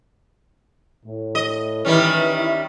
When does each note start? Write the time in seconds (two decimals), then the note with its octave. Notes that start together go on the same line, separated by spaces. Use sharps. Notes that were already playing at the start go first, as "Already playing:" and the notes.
1.05 A2
1.35 D#5
1.85 D#3 E3 G3 C#4
2.34 E4